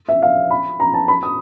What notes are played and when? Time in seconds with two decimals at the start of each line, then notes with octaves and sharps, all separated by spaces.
0.08 E5
0.22 F5
0.51 B5
0.80 A#5
0.94 A5
1.08 B5
1.23 D#6